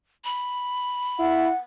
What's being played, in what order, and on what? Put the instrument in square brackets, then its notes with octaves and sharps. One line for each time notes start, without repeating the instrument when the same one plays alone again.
[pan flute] B5
[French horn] E4 [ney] F#5